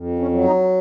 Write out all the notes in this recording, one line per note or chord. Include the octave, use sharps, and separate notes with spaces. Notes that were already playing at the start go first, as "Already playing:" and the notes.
Already playing: F2
C#4
F#3
D#4